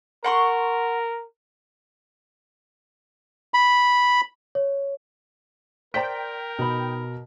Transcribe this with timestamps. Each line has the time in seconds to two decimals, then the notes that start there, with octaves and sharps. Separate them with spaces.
0.24 A#4 F#5 C6 C#6
3.54 B5
4.55 C#5
5.94 A#4 C5 D5 G5 A#5 B6
6.59 B2 D#4 B5